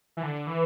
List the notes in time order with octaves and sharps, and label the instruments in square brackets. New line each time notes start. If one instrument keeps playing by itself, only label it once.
[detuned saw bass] E3
D3
E3